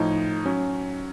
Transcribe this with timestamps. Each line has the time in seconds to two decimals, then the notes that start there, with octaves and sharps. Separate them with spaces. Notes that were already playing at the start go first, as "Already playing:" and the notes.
Already playing: A2 F3 D#4
0.46 F#3 C#4